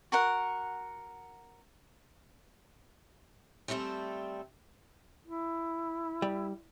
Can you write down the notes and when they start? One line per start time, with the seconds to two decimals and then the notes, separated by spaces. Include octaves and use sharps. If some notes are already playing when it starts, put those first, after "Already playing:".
0.12 F#4 A#4 F#5
3.68 G3 A3 C4 F4 A4
5.26 E4
6.22 G3